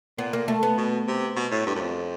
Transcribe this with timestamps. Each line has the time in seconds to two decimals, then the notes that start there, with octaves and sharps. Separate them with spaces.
0.18 A#2 B3
0.33 A#3
0.48 A3
0.63 B3
0.78 B2
1.07 C3
1.36 B2
1.52 A2
1.67 G2
1.75 F#2
1.81 F2